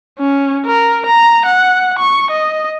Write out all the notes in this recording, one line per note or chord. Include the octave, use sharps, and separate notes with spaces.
C#4
A#4
A#5
F#5
C#6
D#5